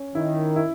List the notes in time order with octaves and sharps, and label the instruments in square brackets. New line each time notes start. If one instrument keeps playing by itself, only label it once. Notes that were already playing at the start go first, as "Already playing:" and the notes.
Already playing: [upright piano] C#4
[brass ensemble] D#3 [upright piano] E4
[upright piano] E4